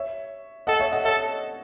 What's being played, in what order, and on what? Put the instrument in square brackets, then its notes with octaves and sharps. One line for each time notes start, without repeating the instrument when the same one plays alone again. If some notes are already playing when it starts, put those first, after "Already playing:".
Already playing: [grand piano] C#5 E5
[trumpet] A4 [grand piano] D#5 F#5
[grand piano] C#5 E5
D#5 F#5
[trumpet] A4 [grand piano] C#5 E5